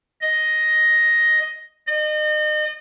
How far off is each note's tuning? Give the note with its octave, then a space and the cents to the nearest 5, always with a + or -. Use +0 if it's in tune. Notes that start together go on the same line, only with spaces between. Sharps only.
D#5 +5
D#5 -35